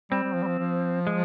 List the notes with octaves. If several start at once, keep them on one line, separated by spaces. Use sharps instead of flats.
G3 C4
G3
F3
G3
F3
F3
G#3